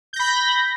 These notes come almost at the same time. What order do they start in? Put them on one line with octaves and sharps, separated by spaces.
G6 A#6 B5